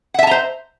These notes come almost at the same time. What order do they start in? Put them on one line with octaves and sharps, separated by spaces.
F#5 E5 A5 A#5 C5